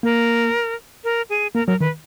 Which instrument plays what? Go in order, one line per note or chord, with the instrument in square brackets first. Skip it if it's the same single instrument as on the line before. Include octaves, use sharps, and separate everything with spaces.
[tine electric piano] A#3 [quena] A#4
[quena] A#4
G#4
[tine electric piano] A#3 [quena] A#4
[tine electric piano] F#3 [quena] A#4
[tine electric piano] D#3 [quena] B4